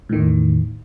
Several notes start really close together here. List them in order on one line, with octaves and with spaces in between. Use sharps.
A2 D#3 E2